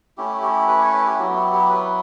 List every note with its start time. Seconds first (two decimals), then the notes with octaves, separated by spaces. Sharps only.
0.17 A3 C#4 E4 G4
0.43 G4
0.68 B4
0.81 C#5
0.94 B4
1.07 G4
1.19 F#3 B3 E4 F#4
1.36 G4
1.53 G4
1.70 B4